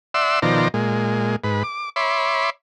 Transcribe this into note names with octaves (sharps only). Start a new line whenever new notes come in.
D5 E5 F#5 C6 E6
B2 D#3 F3 C5 D5 A#5
A#2 G#3
G#2 B4
D6
C#5 E5 B5 C6 D6